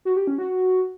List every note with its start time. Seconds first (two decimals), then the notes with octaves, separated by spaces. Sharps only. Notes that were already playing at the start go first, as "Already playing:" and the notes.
0.05 F#4
0.16 G4
0.27 C#4
0.38 F#4